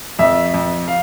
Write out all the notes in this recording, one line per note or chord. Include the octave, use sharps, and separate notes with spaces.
F2 E5
F2
F5